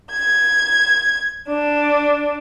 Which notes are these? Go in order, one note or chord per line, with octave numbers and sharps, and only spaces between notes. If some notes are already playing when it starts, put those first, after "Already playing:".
G#6
D4